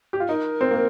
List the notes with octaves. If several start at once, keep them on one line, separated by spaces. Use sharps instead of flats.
G4
F4
D#4 A#4
C4
A#3